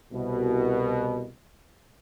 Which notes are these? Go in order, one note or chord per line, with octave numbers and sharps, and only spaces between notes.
C2 B2